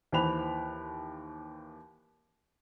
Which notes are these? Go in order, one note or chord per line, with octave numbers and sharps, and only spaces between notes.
D#2 E3 C5 B5 F#6 F7